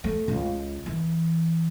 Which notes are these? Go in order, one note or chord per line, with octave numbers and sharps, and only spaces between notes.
A3
C#2
E3